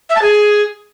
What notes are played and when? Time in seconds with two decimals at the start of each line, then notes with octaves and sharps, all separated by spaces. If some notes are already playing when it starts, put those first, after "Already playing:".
0.09 E5
0.16 A5
0.22 G#4